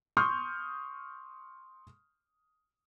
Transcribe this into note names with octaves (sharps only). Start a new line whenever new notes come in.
C6 C#6 D#6 F6 G6